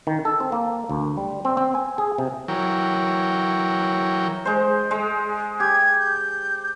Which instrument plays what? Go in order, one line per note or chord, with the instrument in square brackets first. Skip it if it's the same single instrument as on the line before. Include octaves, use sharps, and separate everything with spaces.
[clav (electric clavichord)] D#3
A4
C4
A#3
D2
G3
C4
C4
G#5
G#4
C3
[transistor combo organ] E3 F#3 A#4 C#5 G5
[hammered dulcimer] G#3 C5
G#3
[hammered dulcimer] G4 [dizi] G#6
[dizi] G6